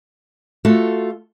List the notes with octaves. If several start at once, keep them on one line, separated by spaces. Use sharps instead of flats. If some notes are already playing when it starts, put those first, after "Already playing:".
A3 F4 F#4 A4